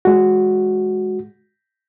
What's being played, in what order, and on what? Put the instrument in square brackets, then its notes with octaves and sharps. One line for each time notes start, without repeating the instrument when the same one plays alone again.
[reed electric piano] G#3 F#4